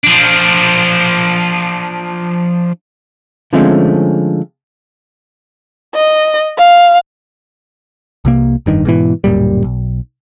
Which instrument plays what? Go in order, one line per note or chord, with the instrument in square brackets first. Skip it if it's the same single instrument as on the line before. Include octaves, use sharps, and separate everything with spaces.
[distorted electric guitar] F3 D4
[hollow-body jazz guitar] D3 F3 G#3 A3 C4 C#4
[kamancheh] D#5
F5
[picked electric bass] C2 C3 A#3
F1 G2 D#3
G#2 B2 E3
D1 F#2 A#2 G3
B1